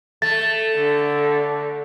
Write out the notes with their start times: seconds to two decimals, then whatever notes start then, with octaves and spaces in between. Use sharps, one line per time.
0.22 A3 A6
0.76 D3